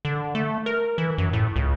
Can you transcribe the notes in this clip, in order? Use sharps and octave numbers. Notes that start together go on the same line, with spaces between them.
D3
A3
A#4
E3
F#2
A2
C#2